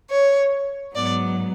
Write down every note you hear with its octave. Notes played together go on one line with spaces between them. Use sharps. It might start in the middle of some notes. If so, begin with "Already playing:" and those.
C#5
G#2 F#3 B3 D5